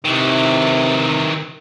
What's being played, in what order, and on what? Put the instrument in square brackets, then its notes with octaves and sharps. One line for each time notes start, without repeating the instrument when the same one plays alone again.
[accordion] C3 [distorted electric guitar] D#3 E3